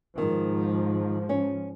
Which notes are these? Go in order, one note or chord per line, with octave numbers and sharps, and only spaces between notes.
G#2 D#3 F3
C#4